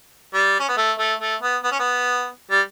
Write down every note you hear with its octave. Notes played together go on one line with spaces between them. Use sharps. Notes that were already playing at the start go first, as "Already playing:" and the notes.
G3
C#4
B3
A3
A3
A3
B3
B3
C#4
B3
G3